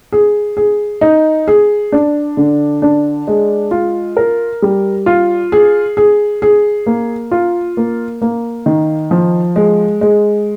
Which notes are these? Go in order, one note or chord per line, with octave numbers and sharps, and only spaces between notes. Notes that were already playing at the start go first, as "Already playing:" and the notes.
G#4
G#4
D#4
G#4
D4
D3
D4
G#3
F4
A#4
G3
F4
G#4
G#4
G#4
A#3
F4
A#3
A#3
D#3
F3
G#3
G#3